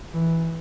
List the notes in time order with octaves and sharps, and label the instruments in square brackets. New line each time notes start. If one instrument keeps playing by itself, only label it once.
[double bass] E3